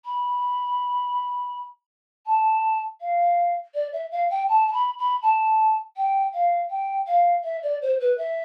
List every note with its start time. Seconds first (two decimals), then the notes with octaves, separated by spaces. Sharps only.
0.05 B5
2.26 A5
3.01 F5
3.74 D5
3.93 E5
4.11 F5
4.30 G5
4.48 A5
4.67 A5
4.73 B5
4.98 B5
5.22 A5
5.96 G5
6.33 F5
6.70 G5
7.07 F5
7.44 E5
7.63 D5
7.81 C5
8.00 B4
8.18 E5